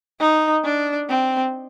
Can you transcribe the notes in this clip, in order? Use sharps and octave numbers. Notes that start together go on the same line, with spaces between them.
D#4
D4
C4